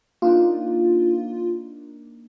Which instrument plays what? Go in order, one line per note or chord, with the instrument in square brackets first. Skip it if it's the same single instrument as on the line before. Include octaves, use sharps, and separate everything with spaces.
[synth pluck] A#3 D4 D#4 [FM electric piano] F4